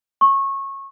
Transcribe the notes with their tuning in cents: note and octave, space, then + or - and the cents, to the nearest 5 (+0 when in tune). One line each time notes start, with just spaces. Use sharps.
C#6 -20